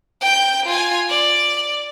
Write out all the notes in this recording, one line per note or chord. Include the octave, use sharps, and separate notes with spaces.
G5 G6
F4 G#5
D5